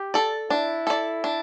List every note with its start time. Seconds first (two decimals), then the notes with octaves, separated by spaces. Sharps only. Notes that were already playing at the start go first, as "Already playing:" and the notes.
Already playing: G4
0.14 A4 D5
0.50 D4 E4
0.87 A4 D5
1.24 D4